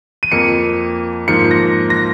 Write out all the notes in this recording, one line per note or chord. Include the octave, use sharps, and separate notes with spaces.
D#7
F2 F3 A#3 C#7
G#2 F3 A#3 C#7
A#6
A#6